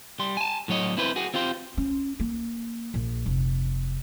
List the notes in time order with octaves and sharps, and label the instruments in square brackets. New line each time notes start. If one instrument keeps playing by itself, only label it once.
[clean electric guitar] G3 C6
G#5 A5
A2 F#3 C#5 D#5
C4 E4 B4 C5
F#4 G#4
C4 F4 G4 C5
[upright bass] C#4
A#3
A#1
F1